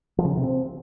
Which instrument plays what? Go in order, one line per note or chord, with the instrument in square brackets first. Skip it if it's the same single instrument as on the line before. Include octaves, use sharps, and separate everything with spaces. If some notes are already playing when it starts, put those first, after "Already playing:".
[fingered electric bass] F3
C#3
D#3
C3
C4